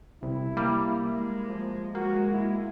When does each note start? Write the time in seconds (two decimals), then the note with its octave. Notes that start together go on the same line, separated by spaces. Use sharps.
0.23 C2 E4
0.57 G3 A#3
1.07 G#3
1.48 F3
1.95 G#3 A#3 F#4
2.32 E4